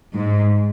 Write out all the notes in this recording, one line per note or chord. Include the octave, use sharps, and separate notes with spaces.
G#2